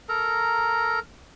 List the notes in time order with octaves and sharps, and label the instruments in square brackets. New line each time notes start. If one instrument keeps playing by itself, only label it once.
[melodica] A4 A#4 A#5